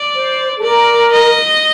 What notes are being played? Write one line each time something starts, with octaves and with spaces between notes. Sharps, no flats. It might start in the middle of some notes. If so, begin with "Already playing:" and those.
Already playing: D5
C5
A4
A#4 D5
D#5